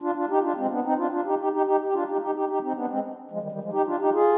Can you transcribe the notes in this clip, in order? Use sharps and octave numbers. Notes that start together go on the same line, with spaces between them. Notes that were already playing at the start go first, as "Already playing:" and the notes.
D4 F4
D4 F4
D#4 G4
D4 F4
G#3 C4
B3 D4
C4 D#4
D4 F4
D4 F4
D#4 G4
D#4 G4
D#4 G4
D#4 G4
G4
D4 F4
D#4 G4
D#4 G4
D#4 G4
D#4 G4
C4 D#4
B3 D4
G#3 C4
F3 G#3
D#3 G3
D#3 G3
F3 G#3
D#4 G4
D4 F4
D#4 G4
F4 G#4